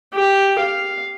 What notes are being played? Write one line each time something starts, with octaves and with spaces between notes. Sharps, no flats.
G4
F5